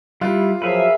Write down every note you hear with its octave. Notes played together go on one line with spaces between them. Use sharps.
G3 E4 F4 F#6
F3 F#3 G#4 A#4 B4 E5 F5